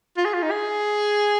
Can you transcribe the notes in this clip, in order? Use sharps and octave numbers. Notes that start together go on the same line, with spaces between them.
F4
G#4
F4
D#4
G#4